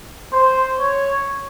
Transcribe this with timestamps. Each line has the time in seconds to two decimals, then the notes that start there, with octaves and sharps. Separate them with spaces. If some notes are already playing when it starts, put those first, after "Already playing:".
0.33 C5
0.79 C#5